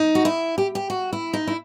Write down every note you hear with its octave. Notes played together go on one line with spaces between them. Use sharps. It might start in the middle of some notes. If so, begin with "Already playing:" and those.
Already playing: D#4
F#4
E4
G4
G4
F#4
E4
D#4
E4